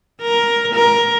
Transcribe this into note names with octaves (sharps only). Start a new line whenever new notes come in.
A#4
A#4